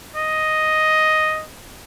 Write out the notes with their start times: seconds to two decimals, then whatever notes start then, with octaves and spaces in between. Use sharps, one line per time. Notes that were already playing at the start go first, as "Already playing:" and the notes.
0.16 D#5